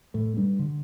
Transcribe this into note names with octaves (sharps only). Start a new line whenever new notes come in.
A2 A3
G2 G3
D3